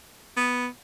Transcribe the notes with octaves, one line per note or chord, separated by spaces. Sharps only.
B3